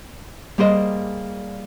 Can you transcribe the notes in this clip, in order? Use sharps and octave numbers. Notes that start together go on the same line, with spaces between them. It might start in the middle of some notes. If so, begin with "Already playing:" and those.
G3 A#3 G#4 C5 D5 D#5